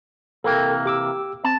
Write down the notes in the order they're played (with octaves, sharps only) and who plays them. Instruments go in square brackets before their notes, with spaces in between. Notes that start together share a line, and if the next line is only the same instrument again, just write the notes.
[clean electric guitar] C3 E3 A#3 [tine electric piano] A4 A#4 G5
[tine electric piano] G4 D6 E6
[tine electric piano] C4 [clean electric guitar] A5